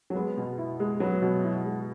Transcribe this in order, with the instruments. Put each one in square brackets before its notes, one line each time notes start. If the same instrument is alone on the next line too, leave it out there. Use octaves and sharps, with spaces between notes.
[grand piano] F#3
[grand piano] G#3 [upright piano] B3
[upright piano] B2
E4
G#3
[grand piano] F#3 [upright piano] B3
[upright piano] B2
E4
G#3